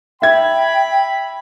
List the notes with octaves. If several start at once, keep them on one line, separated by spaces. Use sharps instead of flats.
E5 G5 B5 G#6